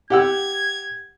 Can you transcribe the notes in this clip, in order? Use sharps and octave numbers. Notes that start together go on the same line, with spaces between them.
G4 F#5 E6 G#6